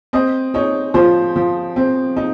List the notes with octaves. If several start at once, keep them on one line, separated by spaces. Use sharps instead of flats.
C4 D#5
D#4 C#5
F3 C5
F3
C4
D#4